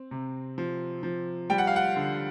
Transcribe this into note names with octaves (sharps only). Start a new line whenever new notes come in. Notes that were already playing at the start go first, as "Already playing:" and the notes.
Already playing: C4
C3
F3
F3
G3 G5
F#5
F5
F#5
D3